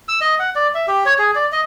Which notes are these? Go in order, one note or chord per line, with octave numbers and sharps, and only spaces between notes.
E6
D#5
F#5
D5
E5
G4
C#5
G#4
D5
D#5